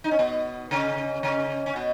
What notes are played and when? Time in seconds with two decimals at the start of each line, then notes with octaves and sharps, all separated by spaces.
0.04 D#4
0.11 C#4
0.19 B2 B3
0.71 C#3 C#4
1.23 C#3 C#4
1.66 C#4
1.76 B2 B3